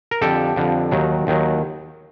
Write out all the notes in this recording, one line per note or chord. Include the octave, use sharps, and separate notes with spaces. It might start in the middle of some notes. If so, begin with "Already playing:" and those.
A#4
F2 D3 F3 G4 A4
F2 D3 F3
D#2 D#3 F#3
D#2 D#3 F#3